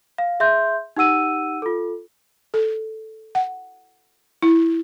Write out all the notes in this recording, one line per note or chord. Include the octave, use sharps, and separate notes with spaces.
F5
G#4 E5 C6 G6
D#4 G4 F#5 E6 D#7
F4 A4
A4
F#5
E4